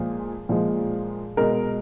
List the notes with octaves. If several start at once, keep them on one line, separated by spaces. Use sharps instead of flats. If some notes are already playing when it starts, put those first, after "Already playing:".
Already playing: A#2 F3 G#3 G#4
A#2 F3 G#3
B2 G#3 A#4